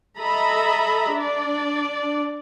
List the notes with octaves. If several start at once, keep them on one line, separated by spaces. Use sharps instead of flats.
A4 D#5 E5 A#5 B5
D4 D5